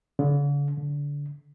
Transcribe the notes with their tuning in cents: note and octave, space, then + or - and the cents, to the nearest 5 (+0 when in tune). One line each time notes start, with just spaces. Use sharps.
D3 -45
D3 -25